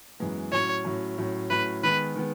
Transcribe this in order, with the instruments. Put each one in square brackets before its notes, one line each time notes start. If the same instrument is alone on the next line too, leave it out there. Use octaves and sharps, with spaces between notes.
[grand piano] F#2 E3 G#3 B3
[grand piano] A2 F#3 C#4 [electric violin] C#5
[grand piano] A2 F#3 C#4
A2 F#3 C#4
[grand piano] A2 F#3 C#4 [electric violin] B4
[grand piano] D#3 G#3 B3 [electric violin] B4
[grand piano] D#3 G#3 B3